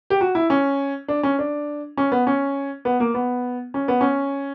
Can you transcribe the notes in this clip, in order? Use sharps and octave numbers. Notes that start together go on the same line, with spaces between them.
G4
F#4
E4
C#4
D4
C#4
D4
C#4
B3
C#4
B3
A#3
B3
C#4
B3
C#4